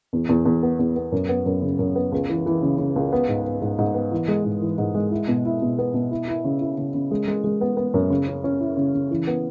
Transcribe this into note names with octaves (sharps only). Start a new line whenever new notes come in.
E2
E2
E2
B3
E2
B3
F#2
B3
F#2
C#3
F#2
B3
C#2
E3
E3
C#3
C#3
C#2
B3
G#2
B3
G#2
G#2
B3
E3
G#3
G#2
E3
G#2
G#3
E4
B2
E4
B2
B3
B2
E4
E4
C#3
E4
C#3
C#3
G#3
G#3
G#3
B3
B3
F#2
C#3
C#4
C#4
E4
C#3
C#3
E3
B3